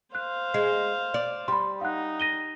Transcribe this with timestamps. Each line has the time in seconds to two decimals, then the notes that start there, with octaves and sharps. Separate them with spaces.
0.15 C5 F5 F#6
0.54 G#3 C7
1.14 D5
1.48 G3 B5 C6
1.81 D#4 F5 F#5 F#6
2.20 A#6 D#7 G7